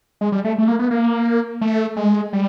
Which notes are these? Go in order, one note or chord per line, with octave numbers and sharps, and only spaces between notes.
G#3
G3
A3
A3
A#3
B3
A#3
A3
G#3
G3